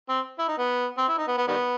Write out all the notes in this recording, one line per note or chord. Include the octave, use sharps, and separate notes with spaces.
C4
E4
D#4
B3
C4
E4
D#4
B3
B3
D#3 G3 B3